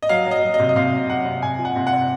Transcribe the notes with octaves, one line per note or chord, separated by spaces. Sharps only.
D#5
F#3 F5
F#3
D#5
F#3
D#5
C3
D#5
C3 F5
F#3
C3 F#5
C3
C3 G#5
F3
F#5
C3
F#5
C3